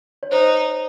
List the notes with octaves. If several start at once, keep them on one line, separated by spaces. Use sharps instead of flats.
C#5
D#4 C5